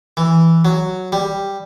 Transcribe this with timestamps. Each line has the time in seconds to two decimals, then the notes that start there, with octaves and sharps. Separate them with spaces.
0.17 E3
0.65 F#3
1.12 G3